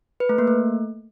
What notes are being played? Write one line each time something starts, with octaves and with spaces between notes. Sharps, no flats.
B4
A3
A#3
A3